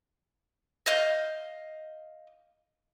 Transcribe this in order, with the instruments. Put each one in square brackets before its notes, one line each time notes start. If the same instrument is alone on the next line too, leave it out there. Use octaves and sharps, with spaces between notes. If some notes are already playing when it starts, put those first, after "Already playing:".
[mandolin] D#5 F5 G6